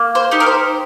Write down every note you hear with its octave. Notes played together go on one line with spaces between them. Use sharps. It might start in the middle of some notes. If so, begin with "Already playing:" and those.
Already playing: A#3
C5
D#4 G4
A#4
C5